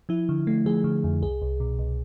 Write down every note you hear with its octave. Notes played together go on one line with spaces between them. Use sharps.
F3 E4
D3
A3
F3 G#4
D3
F2
C2 G#4
C2
B2
C2